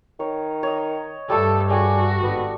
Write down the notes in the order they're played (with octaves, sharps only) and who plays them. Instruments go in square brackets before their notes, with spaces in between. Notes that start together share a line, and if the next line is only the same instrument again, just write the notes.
[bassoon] D#3 [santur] C#5
[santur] C#5 D#5
[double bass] G2 [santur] G3 A3 [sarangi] A4
[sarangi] F#4 [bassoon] G#4 [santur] D5 G5
[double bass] G#1 [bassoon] B3